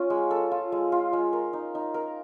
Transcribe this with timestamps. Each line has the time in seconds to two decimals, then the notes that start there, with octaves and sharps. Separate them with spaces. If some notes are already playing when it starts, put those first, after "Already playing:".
Already playing: C#4 F4
0.10 G#3
0.31 A4
0.51 F4
0.72 G#3
0.92 F4
1.13 G#3
1.33 A#4
1.53 D#4
1.75 D#4
1.94 A#4